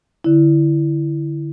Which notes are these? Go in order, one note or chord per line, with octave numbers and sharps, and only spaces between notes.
D3 E4